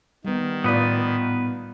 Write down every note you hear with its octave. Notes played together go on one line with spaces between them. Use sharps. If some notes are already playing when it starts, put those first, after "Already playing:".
D#3 G3 B3
A2 B3 F4 B4 D5